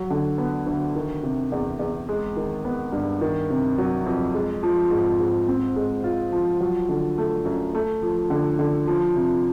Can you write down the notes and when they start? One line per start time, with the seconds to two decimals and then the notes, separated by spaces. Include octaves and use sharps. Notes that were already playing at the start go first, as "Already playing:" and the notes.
Already playing: F#3
0.10 D3
0.38 B3
0.66 D2
0.95 D#3
1.23 C3
1.52 E2
1.79 E2
2.09 G#3
2.37 D#3
2.65 B3
2.92 G2
3.21 D#3
3.50 C3
3.78 F#3
4.06 F2
4.34 G#3
4.63 F3
4.91 G#2
5.20 G#2
5.48 C4
5.76 G#3
6.04 F4
6.32 F3
6.61 F#3
6.89 D3
7.18 A3
7.45 F#2
7.75 A3
8.02 F3
8.30 D3
8.59 D3
8.87 F3
9.16 C3